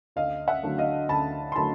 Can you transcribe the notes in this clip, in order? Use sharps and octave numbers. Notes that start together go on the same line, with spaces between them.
D2 D#5 F5
E5 F#5
D3 F#3 A3
D#5 F5
D2 A5 B5
C6
D3 F#3 A3 A5 B5